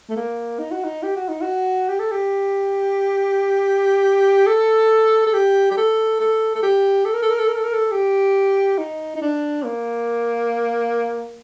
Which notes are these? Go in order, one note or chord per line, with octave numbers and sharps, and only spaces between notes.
A3
A#3
D#4
F#4
D#4
G4
F#4
D#4
F#4
G4
A4
G4
A4
A4
G4
G4
A4
A4
A4
G4
A4
A#4
A4
A#4
A4
A#4
A4
A#4
A4
G4
D#4
D#4
D4
A#3